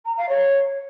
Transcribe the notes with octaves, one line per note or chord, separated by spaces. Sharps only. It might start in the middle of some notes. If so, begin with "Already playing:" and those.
A#5
F5
C#5